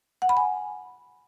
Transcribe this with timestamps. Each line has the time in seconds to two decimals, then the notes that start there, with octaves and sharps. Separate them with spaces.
0.22 F#5
0.29 B5
0.37 G#5